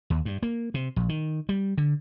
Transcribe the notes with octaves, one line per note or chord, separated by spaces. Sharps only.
D#2
G2
A#3
C3
A#1
D#3
G3
D3